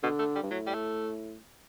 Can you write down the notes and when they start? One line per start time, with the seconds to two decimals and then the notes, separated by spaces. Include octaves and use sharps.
0.03 B2 D3
0.19 A3
0.35 G3
0.42 G2
0.51 A2 F#3
0.67 G3
0.74 A3